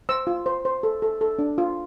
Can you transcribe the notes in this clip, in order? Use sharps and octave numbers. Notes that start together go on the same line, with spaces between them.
C5 E6
F4
C5
C5
A4
A4
A4
D4
F4